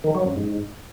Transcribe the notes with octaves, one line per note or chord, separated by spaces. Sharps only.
D#3
F#3
F#2
G#2